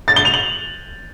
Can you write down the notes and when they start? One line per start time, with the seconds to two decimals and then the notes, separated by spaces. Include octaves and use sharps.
0.08 A6
0.16 G7
0.25 F7
0.34 F#7